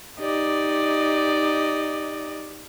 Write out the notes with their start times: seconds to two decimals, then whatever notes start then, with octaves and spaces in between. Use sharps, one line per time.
0.20 D#4 G4 D5 D#5